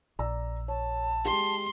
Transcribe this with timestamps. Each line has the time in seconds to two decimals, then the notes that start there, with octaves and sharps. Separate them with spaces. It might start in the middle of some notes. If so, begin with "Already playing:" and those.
0.19 A#1 D5 A#5 E6
0.68 C#5 A5
1.25 G#3 G4 C6